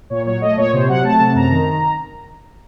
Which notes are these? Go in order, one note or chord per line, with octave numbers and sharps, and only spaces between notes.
A#2 C#5
F#3 C#5
A3 D#5
A#2 C#5
C3 C5
F#3 F#5
A3 A5
C3
F#2 A#5
D#3